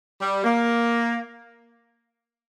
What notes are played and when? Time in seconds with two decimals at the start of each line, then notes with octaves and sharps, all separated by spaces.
0.21 G3
0.44 A#3